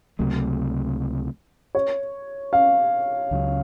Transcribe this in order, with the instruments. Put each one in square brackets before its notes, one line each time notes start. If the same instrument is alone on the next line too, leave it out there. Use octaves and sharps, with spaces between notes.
[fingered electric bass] C#2 C3 F#3 A3
[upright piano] C#5
F5
[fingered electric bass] C#2 C#3 F#3